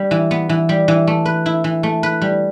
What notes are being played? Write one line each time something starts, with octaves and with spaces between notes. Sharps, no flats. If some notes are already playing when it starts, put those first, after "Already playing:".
Already playing: G3
E3
B3
E3
G3
E3
A3
B4
E4
E3
A3
B4
G3